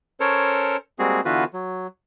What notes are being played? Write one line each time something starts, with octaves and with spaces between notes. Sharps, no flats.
C#4 A4 A#4 C5 C#5
G3 G#3 A#3 C4 F#4 G#4
D3 E3 B3 F4 F#4 B4
F#3